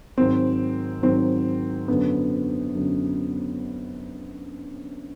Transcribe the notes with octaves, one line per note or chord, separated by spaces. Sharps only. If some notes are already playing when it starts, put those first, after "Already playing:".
G#2 D#3 F#3 C4
G#2 D#3 F#3 C4
F#2 D3 F#3 B3
F#2 D3 F#3